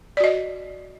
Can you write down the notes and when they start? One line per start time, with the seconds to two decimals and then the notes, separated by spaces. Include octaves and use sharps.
0.17 D5
0.20 F#4
0.24 D#5